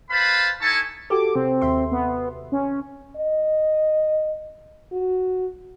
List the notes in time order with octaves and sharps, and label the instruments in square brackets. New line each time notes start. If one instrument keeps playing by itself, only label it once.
[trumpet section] B4 C5 F5 A5 B5
D#4 E4 A4 G#5 A5 C#6
[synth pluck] F#4 G4 A4 [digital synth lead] D6
[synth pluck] C3 [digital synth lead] C4
[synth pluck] D#2 E5 C6
[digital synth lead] B3
C#4
[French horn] D#5
F#4